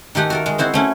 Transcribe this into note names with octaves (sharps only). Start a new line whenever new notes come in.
D#3 A3 G4 F#5 G#5
F#4 A4 A#4
G#3
C4 E4 F#4 C5
A3 C#4 E4